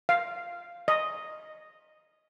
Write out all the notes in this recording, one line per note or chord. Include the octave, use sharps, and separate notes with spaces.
F5
D#5